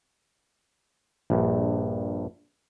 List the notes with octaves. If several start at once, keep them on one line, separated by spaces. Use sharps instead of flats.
A#1 G2